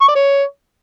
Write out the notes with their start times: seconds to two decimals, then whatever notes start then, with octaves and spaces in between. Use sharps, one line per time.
0.01 C#6
0.08 D5
0.15 C#5